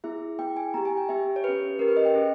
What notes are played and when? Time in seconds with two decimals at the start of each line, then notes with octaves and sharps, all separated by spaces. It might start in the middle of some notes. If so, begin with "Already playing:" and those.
0.04 B3 E4 G#4 E5
0.39 B3 E4 G#4 G5
0.57 G#5
0.74 B3 G4 A#5
0.85 G#5
0.97 G5
1.09 B3 G4 E5
1.36 C#5
1.44 C#4 G4 B4
1.79 C#4 G4 A#4
1.88 B4
1.97 D#5
2.05 G5
2.15 C#4 G#4